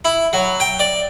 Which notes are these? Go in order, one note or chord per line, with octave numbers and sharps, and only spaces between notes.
E4
F#3
G5
D5